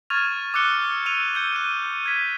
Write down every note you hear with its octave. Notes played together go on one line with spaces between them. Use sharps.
C#6 F6 G#6 A6 D#7 F7
D6 E6 F#6 C#7 G7
E6 D#7 F7
G6 C#7 G7
F#6 D#7
F6 G#6 B6